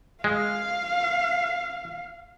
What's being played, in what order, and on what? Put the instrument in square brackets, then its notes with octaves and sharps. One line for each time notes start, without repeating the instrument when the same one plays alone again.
[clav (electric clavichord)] G#3 [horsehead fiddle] F5